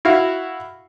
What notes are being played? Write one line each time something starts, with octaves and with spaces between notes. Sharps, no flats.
E4 F#4 F5